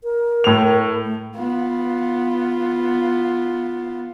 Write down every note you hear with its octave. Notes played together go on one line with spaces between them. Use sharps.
A#4
A2 F7
A3
B3 F4